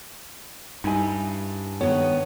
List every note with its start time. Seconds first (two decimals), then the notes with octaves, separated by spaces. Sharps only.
0.84 G2 D#4 E4 G#5
1.81 D#3 B3 C#5